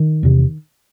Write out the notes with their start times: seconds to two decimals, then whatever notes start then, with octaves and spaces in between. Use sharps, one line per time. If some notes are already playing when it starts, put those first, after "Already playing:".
Already playing: D#3
0.23 E2 C3